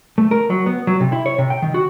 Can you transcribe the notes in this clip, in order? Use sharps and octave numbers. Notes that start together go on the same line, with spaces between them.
A3
A#4
F#3
B3
F#3
C3
E4
C#5
C3
G5
D#3
F#4